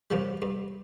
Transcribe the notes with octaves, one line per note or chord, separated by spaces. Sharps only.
F#2 C3 F3 G3
G2